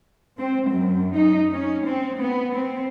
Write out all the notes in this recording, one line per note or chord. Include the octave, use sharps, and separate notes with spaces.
C4
F#2
D#4
C#4
C4
B3
C4